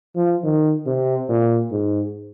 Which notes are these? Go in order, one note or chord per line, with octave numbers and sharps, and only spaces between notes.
F3
D#3
C3
A#2
G#2